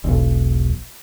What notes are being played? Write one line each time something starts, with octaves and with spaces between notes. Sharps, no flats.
E1 B1